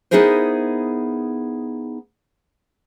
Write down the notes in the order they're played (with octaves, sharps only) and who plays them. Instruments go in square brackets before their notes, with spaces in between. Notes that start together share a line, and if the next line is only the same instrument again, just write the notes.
[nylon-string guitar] B3 D#4 E4 G#4 A#4 C5